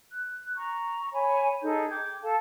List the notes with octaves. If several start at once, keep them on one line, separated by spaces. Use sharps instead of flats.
F#6
A#5 C#6
C#5 G#5 B5
D#4 G#4 A4 G6
G5 D6 G6 G#6
A4 F5 A5